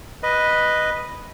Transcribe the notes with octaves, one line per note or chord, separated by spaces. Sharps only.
B4 D#5